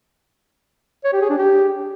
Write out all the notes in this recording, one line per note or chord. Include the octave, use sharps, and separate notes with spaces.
C#5
G4
G#4
D4
G4